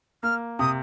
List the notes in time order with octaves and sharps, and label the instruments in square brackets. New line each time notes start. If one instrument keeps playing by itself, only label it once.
[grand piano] A#3 [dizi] F6
[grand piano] C3 [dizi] D#6